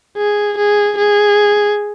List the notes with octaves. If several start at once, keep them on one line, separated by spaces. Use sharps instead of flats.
G#4
G#4
G#4